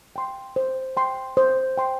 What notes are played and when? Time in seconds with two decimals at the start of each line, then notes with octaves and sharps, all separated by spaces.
0.16 G5 C6
0.56 C5
0.97 G5 C6
1.37 C5
1.78 G5 C6